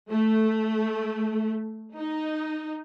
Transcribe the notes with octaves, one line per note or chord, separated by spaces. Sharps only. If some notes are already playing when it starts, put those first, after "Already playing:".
A3
D#4